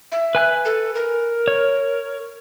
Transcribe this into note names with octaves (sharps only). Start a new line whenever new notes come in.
E5
B4 G#5 F#6
A4
A#4
C#5